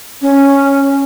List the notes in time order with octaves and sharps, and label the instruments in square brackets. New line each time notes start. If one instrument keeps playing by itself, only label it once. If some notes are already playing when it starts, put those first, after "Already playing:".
[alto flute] C#4